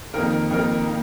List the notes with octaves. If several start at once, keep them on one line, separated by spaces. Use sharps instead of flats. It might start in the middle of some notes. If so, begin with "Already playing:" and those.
F2 D#3 A#3 D#4 A#4
F2 D#3 A#3 D#4 A#4
D#3 A#3